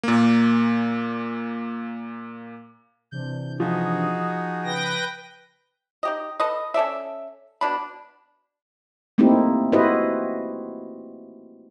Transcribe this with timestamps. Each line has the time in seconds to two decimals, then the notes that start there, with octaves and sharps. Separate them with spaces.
0.03 A#2 A#3
3.12 C3 E3 D4 G6
3.60 F3 D#4 F#4 G#4
4.64 C#3 B4 G5 A#6
6.03 D#4 G4 D#5
6.40 A4 B4 D#5
6.74 C#4 A4 D5 E5
7.61 B2 D4 B5
9.18 A3 A#3 C4 D#4 E4 G4
9.72 E4 F#4 G4 B4 C5 D#5